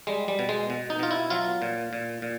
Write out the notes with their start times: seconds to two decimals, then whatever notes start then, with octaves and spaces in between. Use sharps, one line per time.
0.07 G3 G#3
0.28 G3
0.39 B2
0.49 G#3
0.70 B2
0.90 D#4
0.99 B2 F4
1.11 E4
1.30 F#3 F4
1.62 A#2
1.93 A#2
2.22 A#2